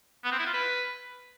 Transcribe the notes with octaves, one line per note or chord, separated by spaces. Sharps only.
B3
C4
E4
F4
B4